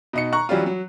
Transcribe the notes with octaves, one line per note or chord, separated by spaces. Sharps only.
B2 D#4 C#7
A#5 C#6 F#6
E3 F#3 G3 C#4 F4
F#3